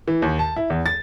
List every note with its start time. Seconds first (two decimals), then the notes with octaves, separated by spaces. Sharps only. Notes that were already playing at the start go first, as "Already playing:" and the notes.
0.08 E3
0.22 D#2
0.39 A5
0.56 E4
0.70 E2
0.86 A6